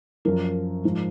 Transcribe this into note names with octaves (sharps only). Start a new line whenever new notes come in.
F#2 F3 A#4
G#2 F3